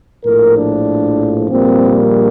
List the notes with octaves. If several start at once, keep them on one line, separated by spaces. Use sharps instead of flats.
A#1 A2 F3 A#4
D4
A#1 A#2 G3 A#3 C4